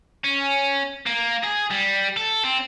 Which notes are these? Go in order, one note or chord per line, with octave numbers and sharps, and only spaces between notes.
C#4
A#3
G#4
G3
A4
C4